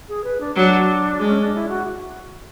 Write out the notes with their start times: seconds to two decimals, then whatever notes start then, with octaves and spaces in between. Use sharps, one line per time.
0.09 G#4
0.24 B4
0.40 D4
0.56 F#3 D4
1.20 G#3
1.27 C#4
1.41 D4
1.55 E4
1.69 F#4